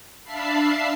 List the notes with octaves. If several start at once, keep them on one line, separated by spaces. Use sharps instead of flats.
D4 E5 F5 A5 B5 C7